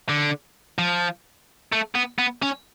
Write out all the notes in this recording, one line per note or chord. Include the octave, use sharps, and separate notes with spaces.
D3
F3
A3
B3
B3
C#4